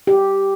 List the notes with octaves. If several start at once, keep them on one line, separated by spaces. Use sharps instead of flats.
G4